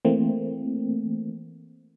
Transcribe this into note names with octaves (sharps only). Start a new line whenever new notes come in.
E3 A3 A#3 C4